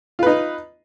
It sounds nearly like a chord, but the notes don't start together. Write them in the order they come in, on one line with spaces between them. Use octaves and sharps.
F4 B4 D#4